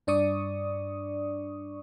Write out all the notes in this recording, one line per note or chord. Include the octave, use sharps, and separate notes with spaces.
G2 D4 D5 C#6 D#6